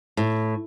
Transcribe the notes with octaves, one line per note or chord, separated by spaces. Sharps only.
A2